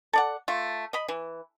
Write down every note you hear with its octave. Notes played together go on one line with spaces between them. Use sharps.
A4 D5 F#5
A3 F4
D#5 B5
E3